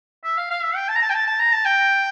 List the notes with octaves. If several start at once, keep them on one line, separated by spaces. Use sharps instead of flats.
E5
F5
F5
E5
G5
A5
A#5
A5
G5
A5
A5
A#5
A5
G5